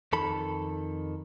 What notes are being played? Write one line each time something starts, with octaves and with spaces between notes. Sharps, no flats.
F2 D#3 A4 B5